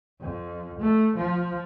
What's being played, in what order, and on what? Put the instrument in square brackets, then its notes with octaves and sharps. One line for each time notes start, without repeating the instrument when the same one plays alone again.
[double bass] F2
A3
F3